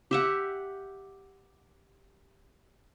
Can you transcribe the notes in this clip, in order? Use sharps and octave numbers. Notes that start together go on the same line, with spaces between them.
G4 E5 F#5